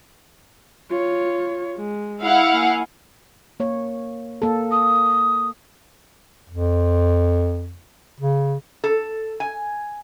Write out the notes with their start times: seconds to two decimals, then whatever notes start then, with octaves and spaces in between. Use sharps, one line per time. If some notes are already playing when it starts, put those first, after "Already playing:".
0.90 F4 C#5
1.77 G#3
2.22 E4 F5 F#5
2.52 A#3 G#5
3.60 A#3 C#5
4.42 A#3 A4
4.71 D#6
6.49 F2
8.20 C#3
8.84 A4
9.40 G#5